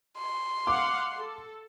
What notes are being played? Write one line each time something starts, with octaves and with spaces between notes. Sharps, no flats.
C6
F5 F#5 D6
A4